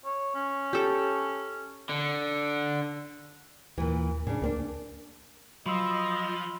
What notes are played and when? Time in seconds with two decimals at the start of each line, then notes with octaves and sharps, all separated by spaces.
0.06 C#5
0.35 C#4
0.73 G4 A4 G5
1.89 D3
3.78 D#2 A#2 E3
4.27 A2 C#3 D4
4.42 D2 A#3 C4 D4
5.66 F3 F#3 D#5 B5 C6 E6